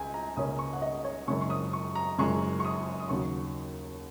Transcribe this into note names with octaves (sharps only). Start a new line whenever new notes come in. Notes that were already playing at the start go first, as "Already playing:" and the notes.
Already playing: C#2 G#5
A#5
C#2 C#3 A#3 C#4 D#6
C#6
F#5
D#5
C#5
F#1 F#2 C#3 G#3 C#6
C#6
D#6
C#6
A#5
F#1 F#2 C#3 G#3 C#6
C#6
D#6
D#6
D#2 C#3 F#3 C#6